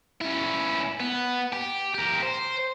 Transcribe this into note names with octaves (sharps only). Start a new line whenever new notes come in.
C#4 E4
B3
G4
G4 A#4
C5